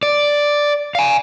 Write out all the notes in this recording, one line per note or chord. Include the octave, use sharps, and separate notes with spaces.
D5
F5 G#5